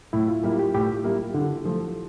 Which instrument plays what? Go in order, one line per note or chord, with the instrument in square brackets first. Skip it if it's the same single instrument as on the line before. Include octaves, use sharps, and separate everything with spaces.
[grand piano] A2 [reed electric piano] E4
[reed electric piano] F4
[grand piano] G3 A#3 E4 [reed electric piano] G4
[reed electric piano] G4
[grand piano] A2 [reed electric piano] G4
[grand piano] G3 A#3 E4
D3
F3 A3